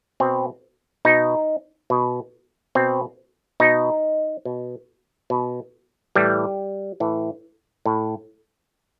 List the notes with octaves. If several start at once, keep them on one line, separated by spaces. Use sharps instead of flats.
B2 C4
B2 D#4
B2
B2 C4
B2 D#4
B2
B2
A2 E3 G3
A2 E3
A2